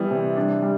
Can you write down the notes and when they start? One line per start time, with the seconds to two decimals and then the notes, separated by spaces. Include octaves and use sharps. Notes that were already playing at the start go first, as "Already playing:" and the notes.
Already playing: E3 G3 B3
0.11 C3
0.36 D4
0.62 G3